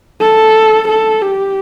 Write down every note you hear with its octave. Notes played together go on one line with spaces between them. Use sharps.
A4
A4
G4